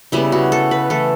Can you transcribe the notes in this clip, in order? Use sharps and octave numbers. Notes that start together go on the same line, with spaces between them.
C#3 G3 B3 E4
F#4
A4
B4
E3 A3 A4